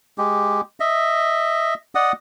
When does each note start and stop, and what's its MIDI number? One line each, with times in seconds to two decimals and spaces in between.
0.18 0.61 56
0.18 0.61 67
0.80 1.74 75
0.80 1.74 76
1.95 2.12 74
1.95 2.12 75
1.95 2.12 78
1.95 2.12 87